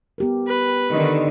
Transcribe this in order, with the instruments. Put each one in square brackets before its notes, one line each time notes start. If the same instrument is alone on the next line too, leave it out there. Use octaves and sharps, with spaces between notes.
[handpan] B3 G4 A#4
[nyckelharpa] B4
[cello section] D3 D#3